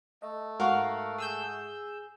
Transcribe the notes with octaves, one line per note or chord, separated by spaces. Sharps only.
A3 D#5
G#2 F#4 A#4 F5 F#5 C#6
G#4 E6 G6